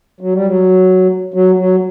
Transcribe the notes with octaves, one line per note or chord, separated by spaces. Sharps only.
F#3
G3
F#3
F#3
F#3